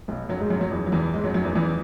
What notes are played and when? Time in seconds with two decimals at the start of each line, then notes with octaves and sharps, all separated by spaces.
0.08 B1 B2
0.29 F#2 F#3
0.40 G#2 G#3
0.50 F#2 F#3
0.61 F#2 F#3
0.71 E2 E3
0.86 F#3
0.92 E2 E3
1.13 G#2 G#3
1.24 F#2 F#3
1.34 F#2 F#3
1.45 E2 E3
1.55 E2 E3